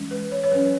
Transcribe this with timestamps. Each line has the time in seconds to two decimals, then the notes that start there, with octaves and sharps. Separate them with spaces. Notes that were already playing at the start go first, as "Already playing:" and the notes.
Already playing: E3 G#3 C#4
0.11 B4
0.31 C#5
0.44 C#5
0.51 F#3 C#4 B4